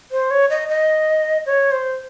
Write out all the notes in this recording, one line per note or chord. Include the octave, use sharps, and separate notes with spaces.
C5
C#5
D#5
D#5
C#5
C5